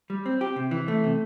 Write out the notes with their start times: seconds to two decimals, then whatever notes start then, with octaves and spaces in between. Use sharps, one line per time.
0.10 G3
0.26 C4
0.41 G4
0.56 C3
0.71 E3
0.88 A3
1.04 C3